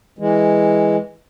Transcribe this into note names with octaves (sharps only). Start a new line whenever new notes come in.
E3 G#3